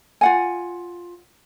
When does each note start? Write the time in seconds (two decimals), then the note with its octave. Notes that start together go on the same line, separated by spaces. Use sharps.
0.21 F4 F#5 G#5